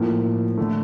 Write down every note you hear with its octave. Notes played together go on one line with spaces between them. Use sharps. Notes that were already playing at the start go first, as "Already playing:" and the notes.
Already playing: A2 F3 A#3
D3 A3